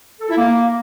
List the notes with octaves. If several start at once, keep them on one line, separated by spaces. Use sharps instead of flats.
A4
E4
A#3